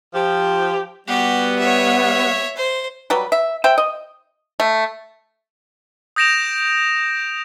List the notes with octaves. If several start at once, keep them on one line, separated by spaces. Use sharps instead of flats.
F3 G4
G3 B3 F#4 G4
C#5 E5
C5
F#3 G3 B4
E5
C5 E5 G5
D#5
A3
D#6 G6 A#6 D7 E7 F7